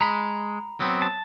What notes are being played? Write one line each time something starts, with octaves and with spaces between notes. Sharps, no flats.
G#3 A#5 B5
F#3 B3 C4
A5